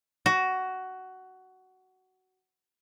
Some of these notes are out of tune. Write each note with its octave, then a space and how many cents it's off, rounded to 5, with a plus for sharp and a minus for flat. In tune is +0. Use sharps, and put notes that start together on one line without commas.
F#4 +15